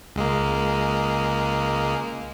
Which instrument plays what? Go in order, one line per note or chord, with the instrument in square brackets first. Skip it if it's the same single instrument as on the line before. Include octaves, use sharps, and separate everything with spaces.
[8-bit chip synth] C#2 G#3 A#3